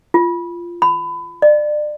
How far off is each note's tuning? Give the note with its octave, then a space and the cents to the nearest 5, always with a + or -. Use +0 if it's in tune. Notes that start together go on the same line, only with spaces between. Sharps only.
F4 -15
B5 +25
D5 +30